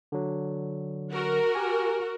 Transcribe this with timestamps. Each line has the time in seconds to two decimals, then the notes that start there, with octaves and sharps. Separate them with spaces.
0.12 D3 F#3
1.11 F#4 A#4
1.55 G4 G#5